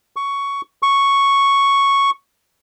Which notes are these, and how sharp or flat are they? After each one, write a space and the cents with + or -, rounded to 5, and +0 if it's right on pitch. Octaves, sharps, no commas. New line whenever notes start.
C#6 +10
C#6 +0